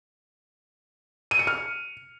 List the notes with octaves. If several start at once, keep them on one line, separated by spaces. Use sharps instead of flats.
D#7
C#7
F6